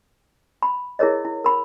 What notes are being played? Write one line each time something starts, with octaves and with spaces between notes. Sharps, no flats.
B5
E4 G#4 A#4 C#5 D#5
E4
A#4 B5